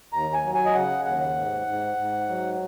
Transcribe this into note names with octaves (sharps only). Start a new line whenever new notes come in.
D#2 A#5
G#5
F#3
G#5
D#5
C#3 F#5
D#2 F#5
G#2
G#2
G#2
F#3